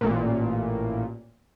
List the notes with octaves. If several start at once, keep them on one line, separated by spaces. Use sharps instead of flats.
A1 A#2